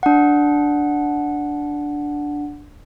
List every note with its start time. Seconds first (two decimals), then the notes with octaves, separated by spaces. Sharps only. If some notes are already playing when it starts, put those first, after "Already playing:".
0.03 D4 F#5